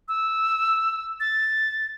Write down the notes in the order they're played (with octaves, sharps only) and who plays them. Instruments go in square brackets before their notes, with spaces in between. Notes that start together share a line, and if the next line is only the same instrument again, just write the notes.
[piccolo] E6
A6